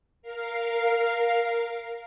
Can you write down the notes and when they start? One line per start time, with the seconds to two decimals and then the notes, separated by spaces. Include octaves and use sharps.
0.22 A#4 F5 C7